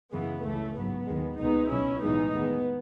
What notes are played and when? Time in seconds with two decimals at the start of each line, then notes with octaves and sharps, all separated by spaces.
0.12 F#2 C#3 E3 G#3 B3
0.44 C#2 C#3 E3 A3
0.75 A1 G#2 F#3 B3
1.07 D#2 D#3 G#3
1.38 C#2 B2 G#3 B3 D#4
1.70 B1 B2 F#3 C#4 E4
2.02 B1 A2 E3 G#3 B3 D#4
2.34 E2 D#3 G#3 B3